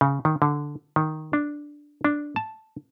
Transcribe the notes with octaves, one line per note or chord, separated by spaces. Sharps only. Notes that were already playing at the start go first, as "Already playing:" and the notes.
C#3
D#3
D3
D#3
D4
D4
A5